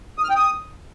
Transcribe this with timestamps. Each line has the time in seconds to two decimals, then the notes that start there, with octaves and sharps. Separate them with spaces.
0.18 D#6
0.24 F6
0.30 G5
0.36 D#6